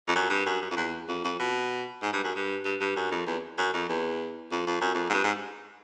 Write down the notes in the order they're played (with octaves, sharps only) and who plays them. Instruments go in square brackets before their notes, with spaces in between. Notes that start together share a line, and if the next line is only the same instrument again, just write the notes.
[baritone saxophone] F2
F#2
G2
F#2
F#2
F2
E2
F2
F2
B2
G#2
G2
F#2
G2
G2
G2
F#2
F2
E2
F#2
F2
E2
F2
F2
F#2
F2
G#2
G2
G#2